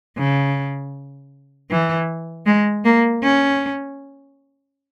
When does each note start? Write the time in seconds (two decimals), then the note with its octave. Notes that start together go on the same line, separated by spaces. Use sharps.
0.18 C#3
1.70 E3
2.46 G#3
2.84 A#3
3.23 C#4